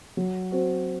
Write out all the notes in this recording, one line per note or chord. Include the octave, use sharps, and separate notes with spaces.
F#3
C4 F#4